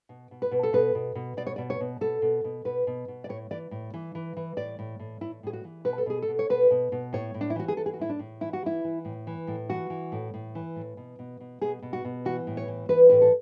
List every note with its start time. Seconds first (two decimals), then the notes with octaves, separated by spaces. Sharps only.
0.09 B2
0.31 B2
0.42 B4
0.51 B2
0.63 A4
0.73 B2 B4
0.95 B2
1.15 B2
1.37 B2 D5
1.47 C#5
1.56 B2 D5
1.70 C#5
1.81 B2
2.01 B2 A4
2.22 B2
2.44 B2
2.65 B2 B4
2.87 B2
3.08 B2
3.24 D5
3.29 A2 C#5
3.51 E3 D5
3.71 A2
3.94 E3
4.15 E3
4.37 E3
4.57 A2 D5
4.79 A2
4.99 A2
5.21 A2 E4
5.43 A2 G#4
5.53 F#4
5.65 E3
5.85 B2 B4
5.98 A4
6.06 B2 G#4
6.22 A4
6.28 B2
6.39 C#5
6.50 B2 B4
6.71 B2
6.92 B2
7.13 A2 C#5
7.34 A2
7.41 D4
7.50 E4
7.56 E3 F#4
7.68 G#4
7.77 E3 A4
7.86 G#4
7.93 F#4
7.99 A2 E4
8.09 D4
8.19 A2
8.41 E3 E4
8.53 F#4
8.63 E3 E4
8.84 E3
9.05 A2
9.27 E3
9.47 A2
9.70 E3 F#4
9.90 E3
10.12 A2
10.34 A2
10.55 E3
10.76 A2
10.97 B2
11.19 B2
11.40 B2
11.61 B2 G#4
11.82 B2
11.93 F#4
12.05 B2
12.25 E3 F#4
12.47 A2
12.57 C#5
12.68 E3
12.89 E3 B4
13.09 A2 B4
13.21 A4